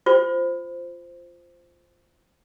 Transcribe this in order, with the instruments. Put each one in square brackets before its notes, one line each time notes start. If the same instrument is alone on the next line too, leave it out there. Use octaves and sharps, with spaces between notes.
[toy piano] F4 C5